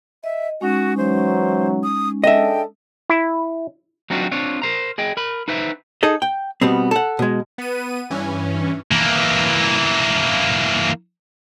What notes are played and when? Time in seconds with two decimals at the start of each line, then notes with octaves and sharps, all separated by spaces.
0.24 D#5 E5
0.61 G#3 C#4 D#4 F#4
0.97 E3 F#3 C5
1.83 D#6
2.24 D4 G#4 A4 D#5 E5 G5
3.10 E4
4.10 F#3 C4 D4 D#4 F4 F#4
4.31 C4 D4 F4 C#5
4.62 A#4 C5 A#5
4.98 G#4 D#5 G5
5.17 A#4 B5
5.48 D#4 B4 C5 E5
6.03 D#4 G#4 A4 D#5
6.22 G5
6.61 B2 G3 B3 C4
6.91 A4 F#5
7.19 B2 G#3
7.58 B3 D#7
8.10 G2 E3 C#4
8.91 E3 A#3